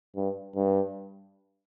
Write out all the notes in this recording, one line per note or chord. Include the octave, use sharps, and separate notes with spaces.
G2
G2